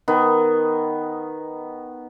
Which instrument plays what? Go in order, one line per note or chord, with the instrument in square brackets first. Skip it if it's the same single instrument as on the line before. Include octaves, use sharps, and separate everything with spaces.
[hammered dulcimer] D#3 B3